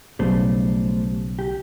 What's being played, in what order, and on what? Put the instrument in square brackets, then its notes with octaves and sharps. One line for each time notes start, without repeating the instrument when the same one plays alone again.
[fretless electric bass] B1 C#3 [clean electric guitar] G3 A3 C5
[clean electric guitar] G4